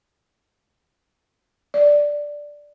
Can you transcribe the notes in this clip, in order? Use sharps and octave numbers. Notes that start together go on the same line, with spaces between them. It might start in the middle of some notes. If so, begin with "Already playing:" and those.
D5